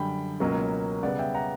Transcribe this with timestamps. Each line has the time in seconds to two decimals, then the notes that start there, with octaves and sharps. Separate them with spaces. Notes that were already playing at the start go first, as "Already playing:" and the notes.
Already playing: F#2 D3 G3 G5 B5
0.40 C#2 B2 F#3 A#3 C#4
1.03 C#3 G3 B3 D5 F#5
1.19 E5 G5
1.34 F#5 A#5